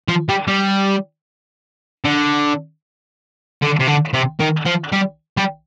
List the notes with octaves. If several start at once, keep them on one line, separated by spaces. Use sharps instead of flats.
F3
G3
G3
D3
D3
C3
D3
C3
D#3
F3
G3
G3